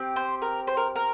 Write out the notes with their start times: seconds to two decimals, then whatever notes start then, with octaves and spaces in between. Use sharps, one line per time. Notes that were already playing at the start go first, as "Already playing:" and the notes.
Already playing: C4 G4
0.16 C5
0.42 A#4
0.67 C5
0.77 A#4
0.96 A#4